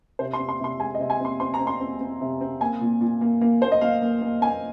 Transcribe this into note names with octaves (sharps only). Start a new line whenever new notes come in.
C3 C5
C6
C4
C6
C3 C6
G#3 G#5
D#5
C3
G#5
C4
C6
C4 C6
A#5
C4
C6
C4
C4
C3
C4
A#3 G#5
A#2
A#2
A#3
A#3
A#3 C5
D#5
A#3 F5
A#3
A#3
A#3 G#5